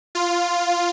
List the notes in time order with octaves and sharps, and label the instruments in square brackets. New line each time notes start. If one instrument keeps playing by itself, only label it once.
[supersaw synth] F4